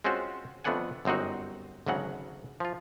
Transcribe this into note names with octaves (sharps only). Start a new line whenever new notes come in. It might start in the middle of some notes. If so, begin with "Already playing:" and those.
G#3 C4 C#4 F4 F#4 C5
F2 A3 B3 D4 F#5 G#5
G1 F#2 C4 D#4 F#4
G#1 D2 C#3 F#3 F#5
F3 F4